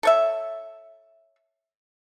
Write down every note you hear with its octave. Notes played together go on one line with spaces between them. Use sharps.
A4 C#5 E5